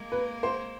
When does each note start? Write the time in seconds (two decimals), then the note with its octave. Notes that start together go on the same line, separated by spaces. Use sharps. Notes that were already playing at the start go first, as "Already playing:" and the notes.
Already playing: G#3 A#3
0.12 B4
0.43 C5